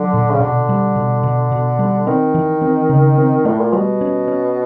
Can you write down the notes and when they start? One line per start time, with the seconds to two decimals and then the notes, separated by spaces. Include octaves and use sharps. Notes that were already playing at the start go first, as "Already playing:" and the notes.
Already playing: D3 F#3
0.14 A#2
0.31 C#3
0.40 B2 D3
0.69 G3
0.96 B2
1.23 B2
1.52 B2
1.79 G3
2.07 D#3 C4
2.34 E3
2.62 C4
2.89 C#3
3.18 C4
3.45 A2 A3
3.59 A#2
3.73 B2 G3
4.01 C#4
4.28 C#4